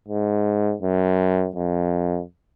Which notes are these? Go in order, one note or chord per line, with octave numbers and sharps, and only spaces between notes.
G#2
F#2
F2